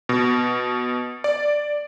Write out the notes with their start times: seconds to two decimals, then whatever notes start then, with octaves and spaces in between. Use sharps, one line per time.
0.09 B2
1.24 D5